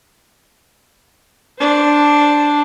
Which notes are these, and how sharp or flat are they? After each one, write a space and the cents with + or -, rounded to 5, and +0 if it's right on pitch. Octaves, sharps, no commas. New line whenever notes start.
D4 +0 C5 +0